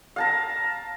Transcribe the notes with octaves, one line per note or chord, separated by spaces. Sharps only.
F5 A5 A#5